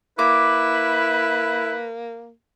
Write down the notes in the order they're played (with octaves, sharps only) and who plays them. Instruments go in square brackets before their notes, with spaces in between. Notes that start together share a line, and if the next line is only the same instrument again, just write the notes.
[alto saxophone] A#3 [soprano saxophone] E4 [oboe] B4 [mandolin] D6